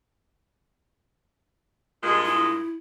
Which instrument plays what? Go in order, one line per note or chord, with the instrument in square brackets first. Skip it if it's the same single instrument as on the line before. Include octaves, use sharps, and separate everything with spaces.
[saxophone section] G2 A#2 G#3
[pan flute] E4